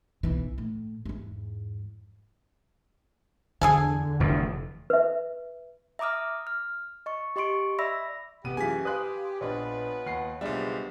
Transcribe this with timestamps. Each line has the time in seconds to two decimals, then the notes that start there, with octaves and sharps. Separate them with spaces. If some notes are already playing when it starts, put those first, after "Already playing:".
0.23 B1 E3
0.58 A2
1.05 E2 G#2
3.61 E2 D3 G#4 A4 G#5
4.20 F1 E2 E3 F4
4.90 B4 E5
5.99 E5 A#5 D6 D#6 F6
6.47 F6
7.06 D#5 C#6
7.36 G4 D#5 C6 C#6 D7
7.79 D5 E5 B5 E6 A#6
8.45 A1 C3 B3 G4 D#7
8.57 F#2 E3 F4 G#4 G#5 B6
8.85 B4 F5 C6 D#6 F#6
9.41 A#1 B3 D4 F4 B4 C#5 D#5
10.06 D#2 F#5 C7
10.41 B1 C#3 F3 G3 G#3 B3 D4 E5